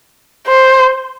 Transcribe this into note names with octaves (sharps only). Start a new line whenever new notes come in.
C5